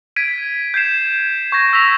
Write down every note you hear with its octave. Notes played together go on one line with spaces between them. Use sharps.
G#6 B6 D7 D#7
G6 G#6 C7 E7
C#6 G6 G#6 A#6
E6 A#6 B6 F7